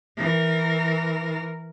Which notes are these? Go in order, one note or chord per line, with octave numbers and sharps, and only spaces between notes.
E3 A#4